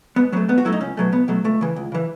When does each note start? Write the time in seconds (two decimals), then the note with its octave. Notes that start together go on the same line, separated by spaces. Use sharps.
0.16 G#2 B3
0.32 F#3 B3
0.37 A3
0.48 G#2 B3
0.58 F#4
0.65 F#3 A3 E4
0.72 D#4
0.81 C#2 C#4
0.97 B2 F#3 A3
1.12 C#2 B3
1.28 B2 F#3 A3
1.44 C#2 A3
1.61 C#3 E3
1.76 C#2
1.92 C#3 E3